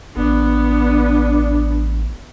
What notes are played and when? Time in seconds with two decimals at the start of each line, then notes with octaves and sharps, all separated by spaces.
0.16 A1 B3 D4